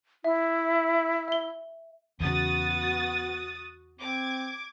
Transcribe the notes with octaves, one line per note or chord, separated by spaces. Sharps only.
E4 E5
E5 G7
E2 C#3 B3 F#4 D#6 A6
C4 D6 G#6